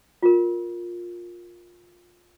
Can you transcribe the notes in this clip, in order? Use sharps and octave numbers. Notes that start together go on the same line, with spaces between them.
F4 A#4